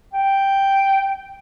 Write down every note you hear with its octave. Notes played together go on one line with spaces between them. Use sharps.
G5